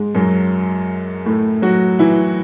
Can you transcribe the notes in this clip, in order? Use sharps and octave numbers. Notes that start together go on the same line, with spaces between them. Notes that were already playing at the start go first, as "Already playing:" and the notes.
Already playing: G#2 G#3
F#2 F#3
A2 A3
F#3 F#4
E3 E4